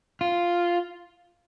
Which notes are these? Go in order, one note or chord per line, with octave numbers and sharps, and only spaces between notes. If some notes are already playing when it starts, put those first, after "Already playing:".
F4